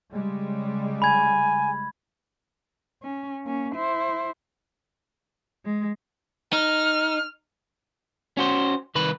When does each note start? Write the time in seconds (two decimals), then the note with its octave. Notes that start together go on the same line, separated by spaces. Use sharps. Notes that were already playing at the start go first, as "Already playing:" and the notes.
0.11 C#3 G3 G#3
1.02 G#5 B5 G#6
3.03 C#4
3.43 A#3 C#4
3.74 E4 C5
5.64 G#3
6.53 D#4 F6
8.37 C#4 F#4 C5
8.95 C2 D#3 B4 B5